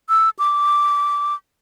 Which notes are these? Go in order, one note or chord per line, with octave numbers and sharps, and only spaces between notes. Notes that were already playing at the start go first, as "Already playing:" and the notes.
E6
D6